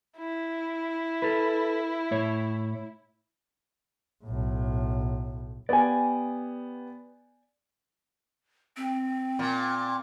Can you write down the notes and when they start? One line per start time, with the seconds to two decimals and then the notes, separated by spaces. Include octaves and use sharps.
0.18 E4
1.22 A4 B4
2.11 A2 C#5
4.25 B1 A2
5.69 B3 G4 D5 G#5
8.77 C4
9.39 A#2